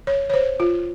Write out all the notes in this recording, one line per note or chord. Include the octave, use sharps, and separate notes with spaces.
C#5
C#5
C5
F4